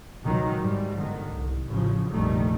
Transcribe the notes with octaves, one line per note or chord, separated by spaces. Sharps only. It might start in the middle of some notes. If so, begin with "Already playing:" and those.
C#2 B2 D#3 F#3
G#2 G3
G1 D3 D#3
C2
A1 C#3 F3
F1 A#1 D#3 G3 A3